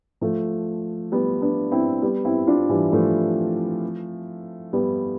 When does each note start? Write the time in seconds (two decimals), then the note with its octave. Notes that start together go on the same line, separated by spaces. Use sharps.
0.21 F3 A3
1.12 G3 B3
1.42 B3 D4
1.72 C4 E4
2.02 G3 B3
2.25 C4 E4
2.47 D4 F4
2.69 E3 G3
2.92 F3 A3
4.73 G3 B3